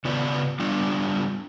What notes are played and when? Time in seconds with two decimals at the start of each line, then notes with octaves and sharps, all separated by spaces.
0.05 C#3 B3 F4 B4 D5
0.60 G3 B3 D4 F4